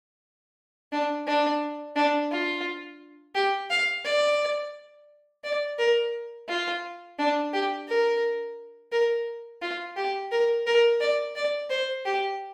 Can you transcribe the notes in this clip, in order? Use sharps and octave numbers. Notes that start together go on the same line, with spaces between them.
D4
D4
D4
F4
G4
F5
D5
D5
A#4
F4
D4
G4
A#4
A#4
F4
G4
A#4
A#4
D5
D5
C5
G4